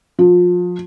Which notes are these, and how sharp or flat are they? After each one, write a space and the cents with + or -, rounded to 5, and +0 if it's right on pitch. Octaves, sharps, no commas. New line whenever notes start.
F3 +30